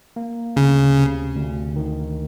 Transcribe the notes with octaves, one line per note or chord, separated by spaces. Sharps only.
A#3
D2 C#3
C3
D2
D#3